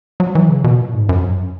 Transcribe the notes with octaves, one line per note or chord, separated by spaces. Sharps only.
F#3
E3
C#3
B2
A#2
G#2
F#2